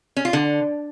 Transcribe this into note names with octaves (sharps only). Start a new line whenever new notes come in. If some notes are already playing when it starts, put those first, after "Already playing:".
C#4
F4
D3